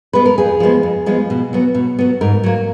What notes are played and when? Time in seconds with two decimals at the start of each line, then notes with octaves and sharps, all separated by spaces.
0.13 G#3 B3 B4
0.25 A#4
0.38 F2 G#4
0.60 F3 G#3 B3
0.83 F2
1.06 F3 G#3 B3
1.30 B2
1.53 F#3 B3
1.75 B2
1.99 F#3 B3
2.21 G#2 A#4
2.44 F#3 A#3